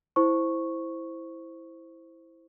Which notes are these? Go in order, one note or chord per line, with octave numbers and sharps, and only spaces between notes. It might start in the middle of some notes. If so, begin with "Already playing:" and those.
E4 C5 C#6